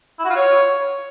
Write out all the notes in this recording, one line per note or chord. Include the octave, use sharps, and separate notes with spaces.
E4
F#4
F4
C#5